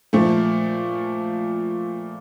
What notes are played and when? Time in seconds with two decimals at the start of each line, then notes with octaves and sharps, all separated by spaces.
0.13 A#2 F3 A3